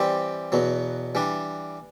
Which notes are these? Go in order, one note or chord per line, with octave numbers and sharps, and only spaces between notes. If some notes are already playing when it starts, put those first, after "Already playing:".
Already playing: E3 G3 C4 G4 D5
E2 B2 F#3
E3 G3 D4